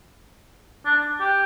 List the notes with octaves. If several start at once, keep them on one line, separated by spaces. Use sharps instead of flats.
D4
G4